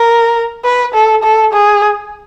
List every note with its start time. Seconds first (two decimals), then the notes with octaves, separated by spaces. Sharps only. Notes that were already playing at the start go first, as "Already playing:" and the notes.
Already playing: A#4
0.65 B4
0.94 A4
1.24 A4
1.53 G#4